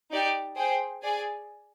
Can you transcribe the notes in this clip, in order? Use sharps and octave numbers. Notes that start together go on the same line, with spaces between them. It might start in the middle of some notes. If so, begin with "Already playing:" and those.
D#4 G4 D5
G#4 C5 G5
G#4 D5 G#5